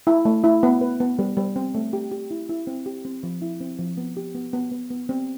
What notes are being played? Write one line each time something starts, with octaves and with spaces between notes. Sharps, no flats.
E4
A3
E4
B3
B4
B3
G3
G3
C4
A3
G4
G4
E4
E4
C4
G4
C4
F3
E4
C4
F3
B3
G4
B3
B3
B3
B3
C4